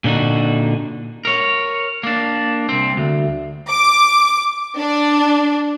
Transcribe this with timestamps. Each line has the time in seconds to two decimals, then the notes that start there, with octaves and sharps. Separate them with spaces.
0.04 A#2 D3 D4 D#4 F#4
1.25 A#4 C#5
2.03 A#3 D4
2.69 C2 C4
2.97 D2
3.71 D6
4.79 D4